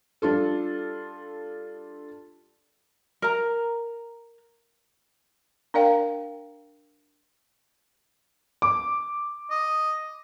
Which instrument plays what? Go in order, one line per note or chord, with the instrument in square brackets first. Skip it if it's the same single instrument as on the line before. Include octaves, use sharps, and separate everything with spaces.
[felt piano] G3 D4 F4 A4
[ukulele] A#4 A#5
[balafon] D4 A#4 D5 F5 G5
[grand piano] D6
[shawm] D#5